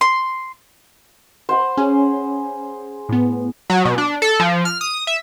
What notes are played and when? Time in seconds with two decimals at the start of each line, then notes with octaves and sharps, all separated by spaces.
0.01 C6
1.49 C5 F#5 B5
1.77 C#4 G#4
3.09 A2 B3
3.70 F#3
3.85 B2
3.98 D4
4.22 A4
4.40 F3
4.65 F6
4.81 D#6
5.07 E5